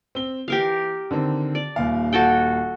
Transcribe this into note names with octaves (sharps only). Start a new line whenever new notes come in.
C4 G7
E3 G4 A#4 F5
D3 D#3 C4
D5
D#1 D#2 F5
F#4 A4 G5